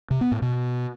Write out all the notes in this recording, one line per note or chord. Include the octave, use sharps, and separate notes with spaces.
C3
B3
A2
B2